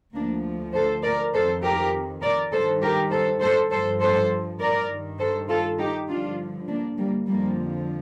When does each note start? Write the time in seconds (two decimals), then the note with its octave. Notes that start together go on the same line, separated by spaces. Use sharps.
0.15 D2 D3 F3 A#3 D4
0.74 A4 C5
1.04 A#4 D5
1.34 F2 D#3 A4 C5
1.63 G4 A#4
2.22 A#4 D5
2.52 G2 D#3 A4 C5
2.82 G4 A#4
3.12 A4 C5
3.41 A4 C5
3.71 G2 F3 A4 C5
4.01 A4 C5
4.60 A#4 D5
4.90 G2 D#3
5.20 A4 C5
5.49 F4 A4
5.79 D#4 G4
6.08 G2 D3 F3 D4 F4
6.68 A#3 D4
6.97 G3 A#3
7.27 F2 D3 F3 G3 A#3